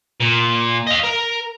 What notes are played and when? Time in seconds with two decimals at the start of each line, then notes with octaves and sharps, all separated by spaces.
0.20 A#2
0.87 D#5 F5
1.04 A#4